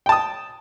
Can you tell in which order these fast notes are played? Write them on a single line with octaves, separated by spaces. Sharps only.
G5 A5 D#6